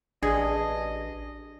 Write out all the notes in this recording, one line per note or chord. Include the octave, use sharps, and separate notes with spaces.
A1 D4 G#4 D#5